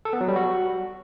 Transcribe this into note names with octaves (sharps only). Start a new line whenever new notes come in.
A4
B3
F#3
G3
F#4